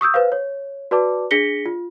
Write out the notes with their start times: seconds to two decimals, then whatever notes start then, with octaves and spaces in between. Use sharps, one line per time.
0.01 C#6 D#6 E6 G6
0.14 B4 C5 F5
0.32 C#5
0.91 F#4 B4 D5 A5 D6
1.31 D4 G#4 A#6 B6 C#7 G7
1.66 F4